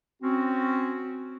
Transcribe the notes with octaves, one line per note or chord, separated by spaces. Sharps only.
C4 C#4 F#4